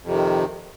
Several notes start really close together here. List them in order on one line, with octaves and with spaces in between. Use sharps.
F2 C3 D#3